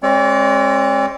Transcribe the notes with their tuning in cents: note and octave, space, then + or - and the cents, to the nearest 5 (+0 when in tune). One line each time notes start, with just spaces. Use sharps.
G#3 +0 C4 +45 D5 -40